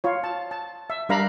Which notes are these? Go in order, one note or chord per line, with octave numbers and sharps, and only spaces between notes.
F4 C#5
A5
A5
E5
G3 D4 A#4 F5 A#5 B5